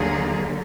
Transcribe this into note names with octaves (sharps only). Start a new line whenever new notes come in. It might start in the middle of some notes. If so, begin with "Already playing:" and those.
Already playing: D#2 D3 F#3 A#3 G#4